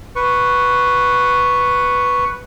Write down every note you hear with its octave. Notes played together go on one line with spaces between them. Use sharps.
B4 C#6